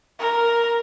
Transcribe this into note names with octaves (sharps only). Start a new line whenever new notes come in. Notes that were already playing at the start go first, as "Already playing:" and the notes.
A#4